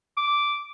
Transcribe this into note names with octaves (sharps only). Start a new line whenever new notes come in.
D6